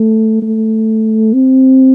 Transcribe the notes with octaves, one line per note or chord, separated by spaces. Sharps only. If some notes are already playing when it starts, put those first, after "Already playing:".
Already playing: A3
A3
C4